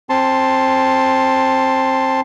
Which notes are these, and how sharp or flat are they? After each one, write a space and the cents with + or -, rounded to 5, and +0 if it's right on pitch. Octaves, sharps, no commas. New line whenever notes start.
C4 +20 A5 +0 C6 +0